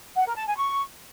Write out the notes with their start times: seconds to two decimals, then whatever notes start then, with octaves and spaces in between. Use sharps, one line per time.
0.16 F#5
0.27 A#4
0.37 A5
0.47 G#5
0.57 C#6